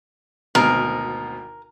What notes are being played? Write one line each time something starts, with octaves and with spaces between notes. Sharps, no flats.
G#1 D2 B2 A#4